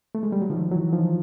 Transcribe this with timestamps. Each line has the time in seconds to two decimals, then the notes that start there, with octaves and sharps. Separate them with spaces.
0.15 A3
0.23 G#3
0.32 G3
0.42 F#3
0.50 D#3 F3
0.71 E3 F#3
0.93 D#3 F3